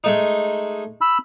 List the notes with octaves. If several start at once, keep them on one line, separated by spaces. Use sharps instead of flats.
G#3 A3 D#4
B5 E6